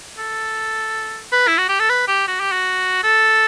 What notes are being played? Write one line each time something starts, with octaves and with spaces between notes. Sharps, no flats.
A4
B4
E4
F#4
G4
A4
B4
G4
F#4
G4
F#4
A4